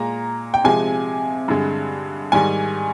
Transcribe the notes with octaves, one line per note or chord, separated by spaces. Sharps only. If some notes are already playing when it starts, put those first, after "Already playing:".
Already playing: A#2 G#3 A#5
G5
C3 F3 G#3 G#5
G2 D3 G#3
G#2 D#3 G3 G#5